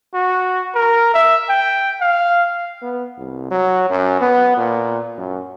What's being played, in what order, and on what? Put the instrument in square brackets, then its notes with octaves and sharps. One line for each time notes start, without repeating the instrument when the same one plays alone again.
[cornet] F#4
A#4
E5
G5
F5
[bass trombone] B3
C2
F#3
F#2
B3
A#2
F#2